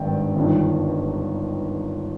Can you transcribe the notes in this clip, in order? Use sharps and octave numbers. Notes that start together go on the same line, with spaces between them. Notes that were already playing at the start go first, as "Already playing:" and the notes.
Already playing: G#1 G2 D#3 G5
G1 G2 D#3